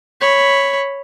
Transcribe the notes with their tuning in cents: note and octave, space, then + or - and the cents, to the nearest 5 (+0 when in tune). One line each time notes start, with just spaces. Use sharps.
C#5 +0 B5 +0